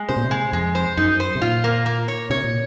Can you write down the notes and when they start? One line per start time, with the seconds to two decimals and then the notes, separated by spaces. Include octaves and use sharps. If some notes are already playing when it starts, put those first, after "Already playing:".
Already playing: G#3
0.08 C3 C5
0.17 A#2
0.24 C3
0.31 G#3
0.53 F2 G#3
0.75 C5
0.97 F#2 D#4
1.20 C5
1.35 C3
1.42 A#2 F4
1.64 A#3
1.86 A#3
2.08 C#5
2.30 C3 C#5
2.44 A#2